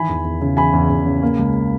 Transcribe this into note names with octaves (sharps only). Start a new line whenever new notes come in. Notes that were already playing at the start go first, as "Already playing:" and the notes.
Already playing: D#3 E3 G#5 B5
E2
E2
C#3
E3 G#5 B5
E2
E2
C#3
A#3
C#2